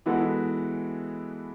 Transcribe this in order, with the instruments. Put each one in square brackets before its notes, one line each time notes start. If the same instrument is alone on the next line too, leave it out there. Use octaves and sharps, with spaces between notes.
[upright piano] E3 G#3 B3 F#4 A4